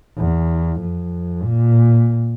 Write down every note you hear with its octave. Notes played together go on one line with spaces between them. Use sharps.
E2
F2
A#2